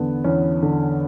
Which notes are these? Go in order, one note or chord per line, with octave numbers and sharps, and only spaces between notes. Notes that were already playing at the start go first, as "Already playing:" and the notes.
Already playing: E2 D3 B3
E2 C#4
D3